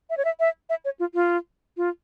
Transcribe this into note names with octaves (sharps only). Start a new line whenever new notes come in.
E5
C#5
E5
E5
E5
C#5
F4
F4
F4